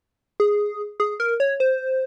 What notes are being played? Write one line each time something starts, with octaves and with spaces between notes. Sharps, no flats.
G#4
G#4
A#4
C#5
C5